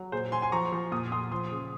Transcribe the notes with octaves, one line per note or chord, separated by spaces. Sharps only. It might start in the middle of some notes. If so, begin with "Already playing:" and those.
Already playing: F#3
A#2 G#4 C5
F#3 G#5 C6
G#5 C6
F3 A#5 C#6
F3
A#2 D#6
A#2 C6 D#6
F3 C6 D#6
C#3